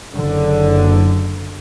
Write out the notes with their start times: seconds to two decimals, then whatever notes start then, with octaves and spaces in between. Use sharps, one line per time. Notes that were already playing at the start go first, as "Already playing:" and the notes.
0.16 F#1 D3